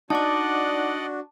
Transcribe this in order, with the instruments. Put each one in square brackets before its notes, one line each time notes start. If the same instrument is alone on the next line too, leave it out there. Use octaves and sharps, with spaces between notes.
[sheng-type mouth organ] D4 F#4 [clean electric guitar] D#4 [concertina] D5 D#5 F#5 [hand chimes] A5 D6